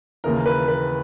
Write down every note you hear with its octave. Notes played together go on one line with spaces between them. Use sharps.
D#2 C#3 E3 A#4
B4
B4